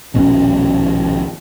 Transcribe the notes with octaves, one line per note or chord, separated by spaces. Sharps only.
D#1 A#1 B2 C#4